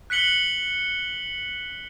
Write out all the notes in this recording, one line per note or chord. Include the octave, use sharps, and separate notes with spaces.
F#6 B6 C#7 F#7 G7